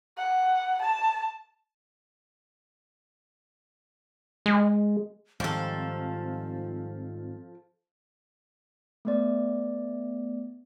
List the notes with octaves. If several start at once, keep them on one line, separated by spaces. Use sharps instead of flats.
F#5
A5
G#3
G#2 D#3 F3 G3 C4 A4
A3 B3 D5